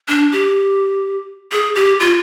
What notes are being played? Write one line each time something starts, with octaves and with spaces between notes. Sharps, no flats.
D4
G4
G#4
G4
F4